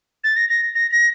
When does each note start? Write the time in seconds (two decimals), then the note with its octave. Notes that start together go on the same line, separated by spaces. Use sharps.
0.24 A6
0.37 A#6
0.49 A#6
0.75 A#6
0.91 A#6